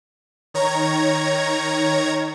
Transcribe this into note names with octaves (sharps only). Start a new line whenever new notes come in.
D#3 C#5 A#5 G#6